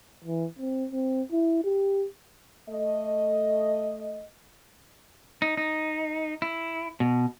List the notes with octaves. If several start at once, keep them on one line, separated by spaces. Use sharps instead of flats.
E3
C4
C4
E4
G4
A3 D#5
D#4
D#4
E4
B2